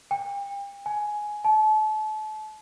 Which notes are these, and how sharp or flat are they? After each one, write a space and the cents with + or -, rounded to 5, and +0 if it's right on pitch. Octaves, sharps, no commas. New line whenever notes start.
G5 +35
G#5 +10
A5 -35